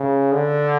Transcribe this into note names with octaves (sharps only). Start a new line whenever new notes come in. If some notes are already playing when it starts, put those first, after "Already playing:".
Already playing: C#3
D3